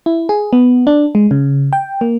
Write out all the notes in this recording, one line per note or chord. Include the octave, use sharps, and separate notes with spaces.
E4
G#4
B3
D4
G#3
C#3
G5
A#3